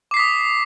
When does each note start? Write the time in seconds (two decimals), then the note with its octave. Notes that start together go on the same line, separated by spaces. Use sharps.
0.11 D6
0.14 C7
0.17 B6
0.19 D#6